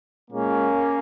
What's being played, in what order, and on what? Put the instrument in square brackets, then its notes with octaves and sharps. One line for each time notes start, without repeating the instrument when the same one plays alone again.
[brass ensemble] A#2 G#3 A#3 C#4